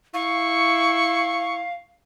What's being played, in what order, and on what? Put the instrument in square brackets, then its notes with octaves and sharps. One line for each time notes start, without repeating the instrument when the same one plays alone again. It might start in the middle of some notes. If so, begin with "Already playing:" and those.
[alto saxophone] E4 [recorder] F5 [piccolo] C#6